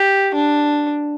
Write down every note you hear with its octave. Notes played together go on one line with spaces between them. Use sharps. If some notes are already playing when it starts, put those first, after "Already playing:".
Already playing: G4
D4